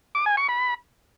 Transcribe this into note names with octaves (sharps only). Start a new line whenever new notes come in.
D6
G#5
C#6
B5